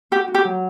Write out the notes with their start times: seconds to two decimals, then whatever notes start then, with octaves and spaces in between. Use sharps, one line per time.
0.11 F#4 G4
0.28 F#4
0.35 G4
0.44 F#3